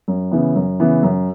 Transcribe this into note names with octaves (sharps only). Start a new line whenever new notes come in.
F#2
C#3 E3 B3
F#2
C#3 E3 B3
F#2